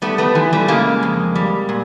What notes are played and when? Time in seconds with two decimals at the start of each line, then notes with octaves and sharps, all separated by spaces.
0.02 G3 A3 B3
0.18 A3 B3
0.35 E3
0.53 G3 A3
0.68 C#3 G#3 A#3
1.03 F2
1.35 G3
1.69 A#2